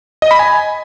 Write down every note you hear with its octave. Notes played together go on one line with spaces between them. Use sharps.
D#5
B5
G#5